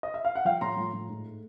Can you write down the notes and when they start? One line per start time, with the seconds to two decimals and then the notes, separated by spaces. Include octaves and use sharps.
0.03 D#5
0.14 E5
0.25 F5
0.35 F#5
0.45 F3 F5 G5
0.61 A2 A#5 C6
0.77 F3
0.93 A2
1.09 G#2
1.25 A3